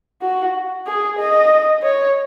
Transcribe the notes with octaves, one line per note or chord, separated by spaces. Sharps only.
F#4
G#4
D#5
C#5